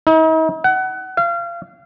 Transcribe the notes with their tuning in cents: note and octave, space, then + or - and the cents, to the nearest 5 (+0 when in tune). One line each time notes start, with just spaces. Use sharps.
D#4 +45
F#5 +25
F5 -30